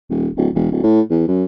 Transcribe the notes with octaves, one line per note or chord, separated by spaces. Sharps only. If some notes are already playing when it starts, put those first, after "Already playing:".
D#1
D1
E1
D1
A2
E2
F#2